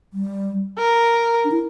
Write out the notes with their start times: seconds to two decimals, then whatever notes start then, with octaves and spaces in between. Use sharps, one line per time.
0.13 G3
0.79 A#4
1.44 D4
1.51 E4